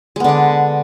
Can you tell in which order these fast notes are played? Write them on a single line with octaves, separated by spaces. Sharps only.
G#3 B3 D3 D4